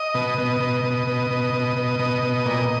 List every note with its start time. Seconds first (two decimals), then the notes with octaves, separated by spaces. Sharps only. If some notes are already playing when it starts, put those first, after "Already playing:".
Already playing: D#5
0.15 B2
0.38 B2
0.60 B2
0.84 B2
1.07 B2
1.30 B2
1.53 B2
1.76 B2
1.99 B2
2.23 B2
2.46 A#2